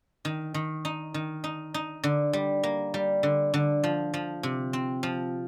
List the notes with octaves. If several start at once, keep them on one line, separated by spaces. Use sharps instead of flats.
D#3
D#3
D#4
D#3
D#4
D#4
D3
G3
A#3
G3
D3
D3
F3
F3
C3
C4
F3